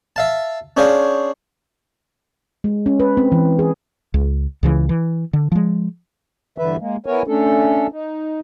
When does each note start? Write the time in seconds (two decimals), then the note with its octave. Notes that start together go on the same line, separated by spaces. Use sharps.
0.16 E5 F5 A5
0.77 C#4 D4 G#4 C5 C#5 F5
2.64 G#3
2.86 C#4
3.00 B4
3.17 C4
3.32 E3
3.59 G#4
4.14 C#2
4.63 C#2 C#3 E3
4.89 E3
5.33 D3
5.52 F3 G#3
6.58 G2 D3 E3 B4 E5
6.79 G#3 A#3
7.06 B3 E4 A#4 C#5 G#5
7.27 A3 C#4 D4 A4
7.92 D#4